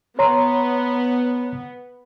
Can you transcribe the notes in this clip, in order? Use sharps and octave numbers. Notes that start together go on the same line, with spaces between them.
B3 C#5 A#5 C6